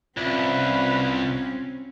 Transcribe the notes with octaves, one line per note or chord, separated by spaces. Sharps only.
C2 C4 C#4 F4 B4